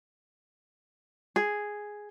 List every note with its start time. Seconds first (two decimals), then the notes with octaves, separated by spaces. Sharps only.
1.36 G#4